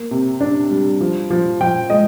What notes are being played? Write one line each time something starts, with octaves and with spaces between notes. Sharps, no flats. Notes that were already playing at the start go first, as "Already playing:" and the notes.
Already playing: A#3
C3
D4
G3
F3
F3
F3 G5
G#3 D#5